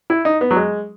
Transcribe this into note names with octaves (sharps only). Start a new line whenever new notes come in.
E4
D#4
B3
F#3
G#3